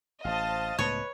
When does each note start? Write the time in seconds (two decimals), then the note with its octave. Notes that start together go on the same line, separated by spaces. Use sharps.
0.25 A1 C5 D#5 F5 A5
0.79 C#2 A2 B3 B4 C#5